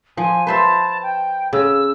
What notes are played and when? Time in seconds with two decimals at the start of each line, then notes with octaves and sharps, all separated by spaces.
0.17 F3 G#5
0.47 B4 C5 E5 A5
1.03 G5
1.53 C#3 E6